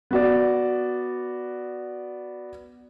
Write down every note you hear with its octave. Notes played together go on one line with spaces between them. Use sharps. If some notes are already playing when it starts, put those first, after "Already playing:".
B3 F#4 D5